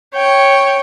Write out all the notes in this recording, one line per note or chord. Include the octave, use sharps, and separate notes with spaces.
C#5 G5